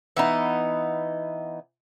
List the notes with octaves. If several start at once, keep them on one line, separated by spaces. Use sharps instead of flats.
E3 B3 D#4